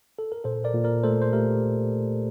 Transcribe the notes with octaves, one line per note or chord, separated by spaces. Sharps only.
A4
A#4
A#2 A4 C5
A#4 D5
A#2
A#4 D5
A3 A4 C5
C5
A3 G4 A#4